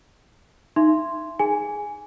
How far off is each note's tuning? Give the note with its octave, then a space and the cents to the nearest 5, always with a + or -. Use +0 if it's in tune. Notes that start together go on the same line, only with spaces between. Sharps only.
D#4 +0 E5 +30 C6 +0
G#4 +0 G#5 +0